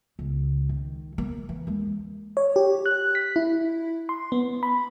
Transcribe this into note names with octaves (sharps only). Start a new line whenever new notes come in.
C#2
D#3
A#3
E3
D#2 G#3
C#5
G4
F#6
B6
E4
C6
B3
B5